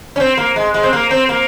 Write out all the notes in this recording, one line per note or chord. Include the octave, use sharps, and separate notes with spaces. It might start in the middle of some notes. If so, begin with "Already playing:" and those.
C#4
C4
A#3
G#3
G#3
C4
A#3
C4
A#3